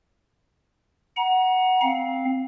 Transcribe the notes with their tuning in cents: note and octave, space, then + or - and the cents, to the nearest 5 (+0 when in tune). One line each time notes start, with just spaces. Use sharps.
F#5 +5 A#5 +35
C4 +0 F5 +0